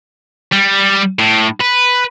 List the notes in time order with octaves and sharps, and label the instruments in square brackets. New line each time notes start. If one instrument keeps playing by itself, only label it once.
[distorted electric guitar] G3
A2
B4